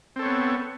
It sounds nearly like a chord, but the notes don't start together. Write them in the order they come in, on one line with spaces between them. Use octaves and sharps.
C4 A4 C#5 B3